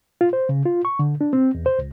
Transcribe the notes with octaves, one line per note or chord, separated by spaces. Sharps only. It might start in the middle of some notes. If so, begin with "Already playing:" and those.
F4
C5
C#3
F4
C#6
D3
D4
C4
E2
C5
C#2